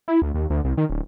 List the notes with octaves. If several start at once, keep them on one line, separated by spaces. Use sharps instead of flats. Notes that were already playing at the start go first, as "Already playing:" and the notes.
E4
D2
D#2
D2
C2
D#3
D1